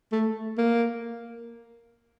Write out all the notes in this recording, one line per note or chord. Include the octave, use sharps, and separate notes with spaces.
A3
A#3